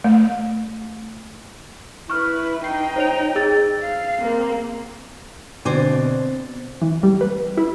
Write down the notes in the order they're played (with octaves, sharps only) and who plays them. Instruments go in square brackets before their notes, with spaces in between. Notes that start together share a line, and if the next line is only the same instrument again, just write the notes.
[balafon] A3
[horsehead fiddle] E4 B4 [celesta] C#6 F6
[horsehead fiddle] D#4 G5 [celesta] C7
[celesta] C5 C#5 F7
G#4 E6 A6
[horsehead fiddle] F5
A#3 C4
[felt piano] B2 D3 [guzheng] C4 D5 G#5
[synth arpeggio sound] E3
G3
B4
E4